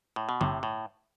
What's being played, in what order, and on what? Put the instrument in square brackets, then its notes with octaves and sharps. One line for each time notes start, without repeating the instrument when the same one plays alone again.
[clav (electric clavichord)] A2
B2
[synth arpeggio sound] G1 [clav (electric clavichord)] A2 C3
[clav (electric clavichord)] A2